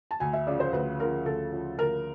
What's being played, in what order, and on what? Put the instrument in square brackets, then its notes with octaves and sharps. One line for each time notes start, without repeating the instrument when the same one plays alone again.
[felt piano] A5
[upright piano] D2 [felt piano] G#5
[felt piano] E5
[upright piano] C#3 F3 [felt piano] D5
[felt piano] C5
[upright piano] D2 [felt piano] B4
[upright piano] C#3 F3 [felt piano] A#4
[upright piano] D2 [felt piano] A4
[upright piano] C#3 F3
[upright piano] D2 [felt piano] A#4